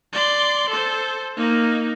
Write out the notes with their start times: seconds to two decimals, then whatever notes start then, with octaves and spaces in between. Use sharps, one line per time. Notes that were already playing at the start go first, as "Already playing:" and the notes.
0.13 D5 C6
0.69 A4 C5
1.37 A#3 D#4